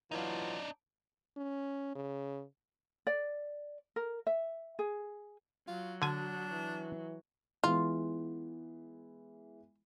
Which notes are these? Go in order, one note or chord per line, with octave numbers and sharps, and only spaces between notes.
E3 F#3 D4 D#4 F4
C#4
C#3
D5
A#4
E5
G#4
F#3 F4
D3 D4 F#4 G#5
E3
E3 G#3 B3 F4